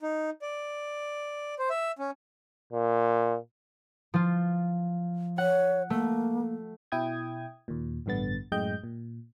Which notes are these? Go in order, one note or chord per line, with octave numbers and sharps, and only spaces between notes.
D#4
D5
C5
E5
C#4
A#2
F3 F4
C#5 F#5
A3 A#3
B2 E4 G5 D#6 G#6
D#2 A#2
A1 G2 D3 B3 A6
F#2 A2 G#3 D#5 G5 G6
A#2